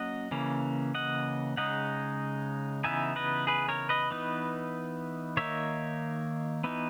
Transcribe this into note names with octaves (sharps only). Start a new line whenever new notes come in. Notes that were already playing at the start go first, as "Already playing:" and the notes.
Already playing: F#3 A#3 C#4 D#5 F#5
C#3 E3 A#3 C#4
D#5 F#5
C#3 G#3 D#4 D#5 F#5
C#3 E3 B3 D#4 E5 G#5
B4 D#5
G#4 B4
A#4 C#5
B4 D#5
E3 B3 D#4
D#3 A#3 D#4 C#5 E5
E3 B3 D#4